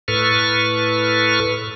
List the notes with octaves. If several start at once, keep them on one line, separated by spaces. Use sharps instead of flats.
A2 A4 B4 C#6 F6